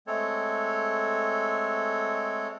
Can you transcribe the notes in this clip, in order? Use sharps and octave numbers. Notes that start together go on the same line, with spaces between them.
G#3 A3 C4 A4 C#5